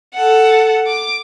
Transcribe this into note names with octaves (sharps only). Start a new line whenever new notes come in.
A4 F#5
D6